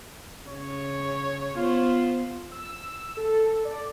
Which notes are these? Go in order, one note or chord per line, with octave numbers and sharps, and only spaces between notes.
C#3 C#5
B3 F4 C5
E6
A4
D5